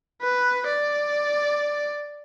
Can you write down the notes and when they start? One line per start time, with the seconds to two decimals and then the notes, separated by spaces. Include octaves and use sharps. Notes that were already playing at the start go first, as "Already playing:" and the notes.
0.21 B4
0.67 D5